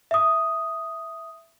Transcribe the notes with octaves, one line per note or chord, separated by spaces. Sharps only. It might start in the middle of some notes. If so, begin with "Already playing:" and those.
E5 D#6